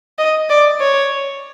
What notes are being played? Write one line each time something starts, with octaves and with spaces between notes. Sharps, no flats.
D#5
D5
C#5